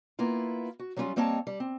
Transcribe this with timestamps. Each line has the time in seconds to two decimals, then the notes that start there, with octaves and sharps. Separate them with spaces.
0.19 A#3 B3 E4 F4
0.79 F#4
0.96 F#3 G3 C#4 D#4 F4
1.16 G3 A#3 C4 C#5 D#5 A5
1.47 G3
1.60 C4